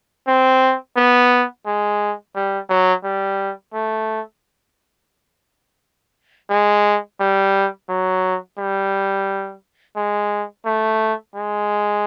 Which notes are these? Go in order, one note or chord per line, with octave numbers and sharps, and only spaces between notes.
C4
B3
G#3
G3
F#3
G3
A3
G#3
G3
F#3
G3
G#3
A3
G#3